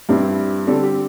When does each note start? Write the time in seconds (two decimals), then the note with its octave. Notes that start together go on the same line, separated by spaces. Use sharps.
0.09 G2 G3 C4 E4
0.67 D3 G3 C4 A4
0.82 G4